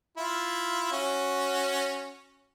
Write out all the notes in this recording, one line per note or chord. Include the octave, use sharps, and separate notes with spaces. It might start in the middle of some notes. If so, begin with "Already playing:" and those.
E4 F4
C#4 F#4